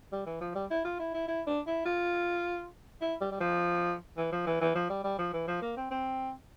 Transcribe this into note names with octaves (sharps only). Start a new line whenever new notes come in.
G3
E3
F3
G3
E4
F4
E4
E4
E4
D4
E4
F4
E4
G3
G3
F3
E3
F3
E3
E3
F3
G3
G3
F3
E3
F3
A#3
C4
C4